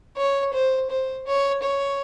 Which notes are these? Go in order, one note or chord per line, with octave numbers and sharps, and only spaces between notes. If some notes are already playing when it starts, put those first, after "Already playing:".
C#5
C5
C5
C#5
C#5